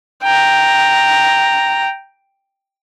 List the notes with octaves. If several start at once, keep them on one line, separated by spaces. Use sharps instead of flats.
G5 A#5